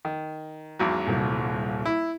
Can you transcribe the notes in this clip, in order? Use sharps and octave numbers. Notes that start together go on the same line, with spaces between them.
D#3
G#1 E2 F#3
D#1 C2
E4